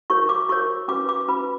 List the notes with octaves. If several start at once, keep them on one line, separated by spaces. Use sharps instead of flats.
F#4 A#4 C#5 C#6
D6
F#4 A#4 C#5 C#6
C#4 F#4 B4 D6
D6
C#4 F#4 B4 B5